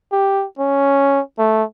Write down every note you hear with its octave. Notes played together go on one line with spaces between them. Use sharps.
G4
C#4
A3